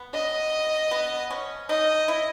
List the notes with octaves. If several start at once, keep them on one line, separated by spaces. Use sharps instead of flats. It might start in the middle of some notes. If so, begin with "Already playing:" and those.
Already playing: B3
D#5
B3
C#4
D#4 D#5
E4